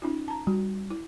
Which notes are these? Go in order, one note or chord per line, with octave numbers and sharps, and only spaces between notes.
C#4 D#4 F4
A5 A#5
G3 F#4
E4